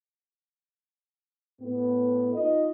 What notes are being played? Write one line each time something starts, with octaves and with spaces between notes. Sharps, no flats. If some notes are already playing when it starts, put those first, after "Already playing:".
A2 B3
D#4 F4 D#5